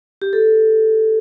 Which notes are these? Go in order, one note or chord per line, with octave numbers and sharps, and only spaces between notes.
G4
A4